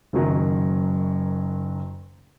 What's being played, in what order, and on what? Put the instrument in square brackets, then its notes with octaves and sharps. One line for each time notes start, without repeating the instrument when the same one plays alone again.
[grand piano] F#1 F#2 D#3 F#3